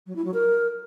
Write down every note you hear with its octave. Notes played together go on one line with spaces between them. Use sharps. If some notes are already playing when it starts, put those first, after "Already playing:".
F#3
E4
F#3
A#4